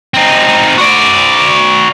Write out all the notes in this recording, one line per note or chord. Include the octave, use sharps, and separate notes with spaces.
C4 D#4
F#4 D5